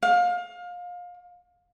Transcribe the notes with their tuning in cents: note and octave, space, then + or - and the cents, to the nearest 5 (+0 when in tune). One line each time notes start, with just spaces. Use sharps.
F5 +25